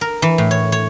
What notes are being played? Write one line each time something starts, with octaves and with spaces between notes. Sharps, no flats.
A#4
E3
A2
C#5
C#5